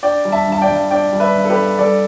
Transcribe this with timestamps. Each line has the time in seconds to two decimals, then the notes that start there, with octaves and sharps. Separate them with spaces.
0.03 D4 D5 G5
0.25 G3
0.32 E5 A5
0.47 G2
0.52 A5
0.62 D5 G5
0.69 G2
0.91 D4 D5 G5
1.13 G3
1.20 B4 E5
1.35 G2
1.45 A4
1.49 G4 B4
1.57 G2
1.79 G3 A4 D5